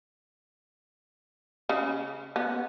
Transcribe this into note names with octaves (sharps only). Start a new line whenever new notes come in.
C#3
B3